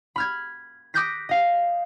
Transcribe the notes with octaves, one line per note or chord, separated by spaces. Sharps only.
B5 F6 G#6
D6 D#6 F#6 G6 A#6 B6
D#5 F5